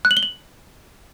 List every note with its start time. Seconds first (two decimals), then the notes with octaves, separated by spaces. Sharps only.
0.05 F#6
0.11 F#7
0.17 G7
0.23 F#7